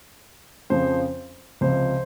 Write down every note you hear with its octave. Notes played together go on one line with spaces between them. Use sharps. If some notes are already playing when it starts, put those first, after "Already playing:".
F2 C#3 F3 C5
C#2 C3 F3 C5